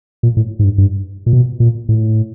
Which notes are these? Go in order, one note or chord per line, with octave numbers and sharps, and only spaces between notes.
A#2
A2
G#2
G2
G2
A#2
B2
A#2
A2